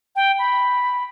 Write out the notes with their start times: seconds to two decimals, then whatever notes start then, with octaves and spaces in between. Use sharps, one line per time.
0.16 G5
0.39 B5